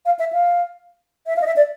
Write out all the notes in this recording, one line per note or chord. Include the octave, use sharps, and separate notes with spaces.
F5
E5
F5
E5
F5
D#5
E5
D5